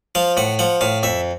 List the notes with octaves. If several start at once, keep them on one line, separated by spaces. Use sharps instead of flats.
F3 F5
A2 F#5
F3 F#5
A2 F5
F2 E5